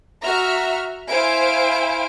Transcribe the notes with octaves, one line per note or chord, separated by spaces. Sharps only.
F#4 E5 A#5 F6
E4 C5 F5 G#5 D7